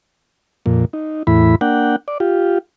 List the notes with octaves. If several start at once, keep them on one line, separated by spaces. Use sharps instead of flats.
F2 A#2
D#4
E2 A2 E4 B5
A#3 D4 F#5 G5
D5
F4 G4